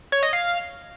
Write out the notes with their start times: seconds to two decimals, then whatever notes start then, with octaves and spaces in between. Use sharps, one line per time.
0.12 C#5
0.23 D#5
0.33 F5